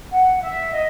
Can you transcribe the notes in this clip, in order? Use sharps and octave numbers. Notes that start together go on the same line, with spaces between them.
F#5
E5
D#5